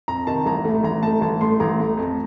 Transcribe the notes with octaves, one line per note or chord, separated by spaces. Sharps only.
F2 A#5
C3 D#3 A5
A1 A#5
A2 A3
A1 A#5
A2 A3 A5
A1 A5
A2 A3 C6
A1 A#5
A2 A3
F2